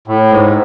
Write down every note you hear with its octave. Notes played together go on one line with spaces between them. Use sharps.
A2
G#2